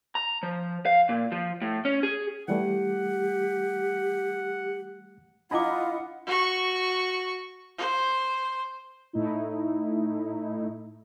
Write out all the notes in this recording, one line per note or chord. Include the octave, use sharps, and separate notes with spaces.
A#5
F3
F5
A#2
F3
A2
C#4
G#4
E3 G3 A3 G4 F#5
D4 E4 F4 D#5 F#5 B5 D6
F#4 C#6
C5
A2 A3 D#4 E4